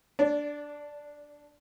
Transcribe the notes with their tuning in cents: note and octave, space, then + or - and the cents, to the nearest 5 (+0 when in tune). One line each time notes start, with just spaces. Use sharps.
D4 +0 D5 -25